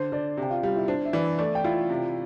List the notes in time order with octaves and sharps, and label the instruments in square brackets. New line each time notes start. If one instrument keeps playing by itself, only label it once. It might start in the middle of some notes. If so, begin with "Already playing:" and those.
Already playing: [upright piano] D3 [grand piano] C5
[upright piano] D3 [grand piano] D5
[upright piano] C3
[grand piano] G5
F4 F5
[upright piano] G3 [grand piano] F4 F5
[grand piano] E4 E5
[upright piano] D4 [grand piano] C5
[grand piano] E5
[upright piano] E3 [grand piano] D5
[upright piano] A3 [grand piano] D5
[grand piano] G5
[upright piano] E4 [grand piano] F4 F5
[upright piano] C3